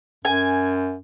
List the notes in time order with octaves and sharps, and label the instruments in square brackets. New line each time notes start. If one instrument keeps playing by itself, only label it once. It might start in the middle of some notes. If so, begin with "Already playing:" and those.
[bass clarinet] F#2 [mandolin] G#5